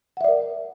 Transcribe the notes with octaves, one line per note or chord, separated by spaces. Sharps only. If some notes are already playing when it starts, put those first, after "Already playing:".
A#4 D5 E5 F#5